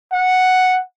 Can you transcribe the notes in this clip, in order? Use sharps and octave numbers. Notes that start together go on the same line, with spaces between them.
F#5